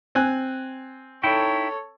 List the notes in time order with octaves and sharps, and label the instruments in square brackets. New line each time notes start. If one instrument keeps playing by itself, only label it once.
[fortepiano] C4 G#5 F#6
[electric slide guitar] D#4 E4 G5 [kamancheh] A4 C#5